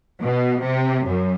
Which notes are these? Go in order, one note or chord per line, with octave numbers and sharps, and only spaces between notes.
B2
C3
F#2